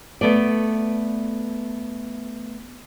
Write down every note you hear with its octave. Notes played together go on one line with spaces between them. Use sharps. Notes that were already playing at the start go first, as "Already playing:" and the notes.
A3 B3 A4 D5